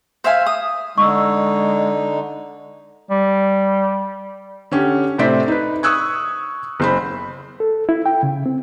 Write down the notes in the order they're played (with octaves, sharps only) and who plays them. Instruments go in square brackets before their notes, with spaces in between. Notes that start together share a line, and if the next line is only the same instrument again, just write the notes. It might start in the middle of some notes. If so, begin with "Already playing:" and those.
[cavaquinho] C5 E5 F5 G#5
D#6
[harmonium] D3 D#4 [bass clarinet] G#3 [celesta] C#6 E6
[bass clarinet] G3
[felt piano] D3 C#4 G4
A2 C3 C5 D5 B6
D#4 B4
C#6 D#6 E6 F#6 G#6
F#1 C5 B5
[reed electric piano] A4
E4
G5
C#3
C4